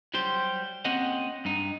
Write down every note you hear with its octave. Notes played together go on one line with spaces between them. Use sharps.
F#3 G3 G4 C5
A#3 C4 C#4 G4 D#5 F#5
G2 D#4